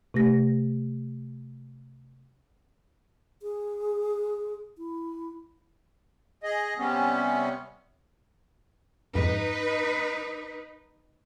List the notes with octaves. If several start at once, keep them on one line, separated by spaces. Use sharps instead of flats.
C3 A3 G4 A#6
G#4
E4
G#4 D#5
C3 G3 B3 C#4
F2 G#2 D#4 B4